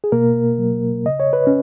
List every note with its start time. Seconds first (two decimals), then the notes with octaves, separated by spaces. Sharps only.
0.04 G#4
0.12 B2 A#3 A#4
0.58 F#3
1.06 C#3 D#5
1.20 C#5
1.33 B4
1.47 C#4